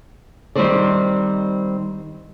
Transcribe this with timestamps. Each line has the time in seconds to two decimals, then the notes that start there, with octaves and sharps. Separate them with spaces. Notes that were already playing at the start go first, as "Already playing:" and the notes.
0.55 D#3 G3 C4 D#4 C5 D5